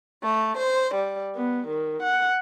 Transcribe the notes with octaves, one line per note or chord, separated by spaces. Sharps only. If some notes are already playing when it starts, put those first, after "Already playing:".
A3
C5
G3
B3
D#3
F#5